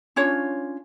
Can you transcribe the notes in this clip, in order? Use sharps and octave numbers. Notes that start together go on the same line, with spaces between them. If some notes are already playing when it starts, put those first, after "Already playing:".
C#4 D4 F4 C#5